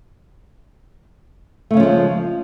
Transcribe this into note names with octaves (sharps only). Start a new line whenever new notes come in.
C#3 F3 G#3 A3 C#4